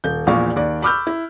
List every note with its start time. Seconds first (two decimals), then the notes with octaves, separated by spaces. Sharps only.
0.04 D#1 G6
0.27 A#1 E2 A#2 F5 C#6
0.56 D#2 D5
0.83 B5 C#6 D6 E6 F6 G6
1.07 E4